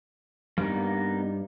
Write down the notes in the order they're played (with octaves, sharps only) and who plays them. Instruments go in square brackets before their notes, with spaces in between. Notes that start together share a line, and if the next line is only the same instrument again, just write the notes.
[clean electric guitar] G2 [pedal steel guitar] A#3 B3 D#4